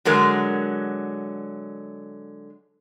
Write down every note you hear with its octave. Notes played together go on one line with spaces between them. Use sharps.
D3 F#3 G#3 A#4